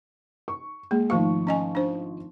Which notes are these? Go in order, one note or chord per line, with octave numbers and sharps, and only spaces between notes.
C#6
G#3 A#3
G#1 F3 A3 F5 C#6
C#4 D#5 G#5
D4 C5